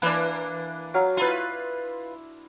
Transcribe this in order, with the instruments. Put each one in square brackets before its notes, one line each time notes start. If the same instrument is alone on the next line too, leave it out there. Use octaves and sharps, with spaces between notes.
[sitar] E3 A#3 [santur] D4 B4
[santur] F#3 F5
[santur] E4 C6 [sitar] F4 B4